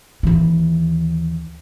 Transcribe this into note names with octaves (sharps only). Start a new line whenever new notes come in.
D#2 E3